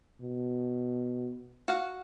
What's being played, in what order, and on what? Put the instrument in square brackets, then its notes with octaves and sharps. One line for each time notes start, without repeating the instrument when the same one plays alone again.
[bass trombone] B2
[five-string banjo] F#4 F5 F#5